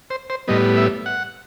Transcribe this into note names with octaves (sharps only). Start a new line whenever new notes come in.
C5
C5
A2 G3 B3 D#5
E5
F#5